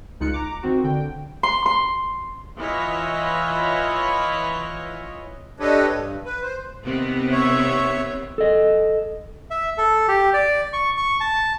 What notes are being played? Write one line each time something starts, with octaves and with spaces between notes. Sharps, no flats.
C#2 G#3 D#4 F4 F#6 C#7
A#5 D6
D#3 C4 F#4
D3 G5
C6
C6
E3 E4 F4 C#5 D#5
D4 G4 A4 B4 C#5 D#5
G2
B4
C5
C3 D#3 B3
C#5 E5
A4 D#5
E5
A4
G4
D5
C#6
C#6
A5